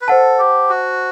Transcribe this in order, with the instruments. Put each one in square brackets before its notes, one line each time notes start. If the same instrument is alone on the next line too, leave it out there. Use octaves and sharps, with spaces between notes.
[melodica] B4
[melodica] A4 [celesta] C5 F#5 A5
[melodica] G4
F#4